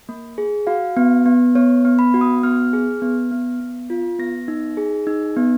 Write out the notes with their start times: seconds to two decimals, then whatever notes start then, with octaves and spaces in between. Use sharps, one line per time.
0.09 A#3
0.38 G#4
0.67 F#4 F5
0.97 B3
1.26 B3
1.55 B3 C#5
1.85 B3
1.99 B5
2.14 F#4
2.21 D#6
2.43 B3 F6
2.73 G#4
3.02 B3
3.31 B3
3.60 B3
3.90 F4
4.19 B3 A#6
4.48 D#4
4.77 G#4
5.07 D#4
5.36 B3